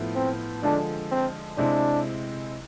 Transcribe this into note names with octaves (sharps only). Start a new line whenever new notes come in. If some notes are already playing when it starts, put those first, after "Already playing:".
Already playing: A2 F3 B3 E4
C4
D3 F3 G#3 D4
C4
C3 G#3 C4 D4 E4